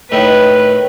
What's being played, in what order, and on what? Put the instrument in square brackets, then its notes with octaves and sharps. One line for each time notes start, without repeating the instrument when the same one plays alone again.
[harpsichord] A2 D#3 [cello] B4